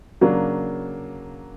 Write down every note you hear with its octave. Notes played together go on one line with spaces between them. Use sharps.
C#3 F#3 A#3 D4